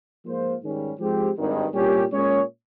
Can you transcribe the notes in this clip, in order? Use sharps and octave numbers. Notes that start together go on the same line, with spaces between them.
G#2 F3 A#3 F4 C5
G#2 D#3 G3 C#4 G4
G#2 F3 G#3 C4 G4
G#1 G2 D#3
C2 A#2 G3 C#4 G4
A#2 G#3 C#4 G#4 C#5